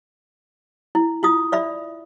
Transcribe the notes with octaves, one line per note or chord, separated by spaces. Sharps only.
E4
E4 F4 D#6
D5 E5 B5